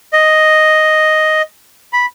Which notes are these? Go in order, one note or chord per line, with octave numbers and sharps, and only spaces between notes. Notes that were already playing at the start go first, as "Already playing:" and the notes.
D#5
B5